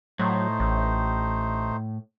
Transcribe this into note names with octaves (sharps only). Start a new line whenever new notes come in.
A2 F#3 A3 D#4 C5
A1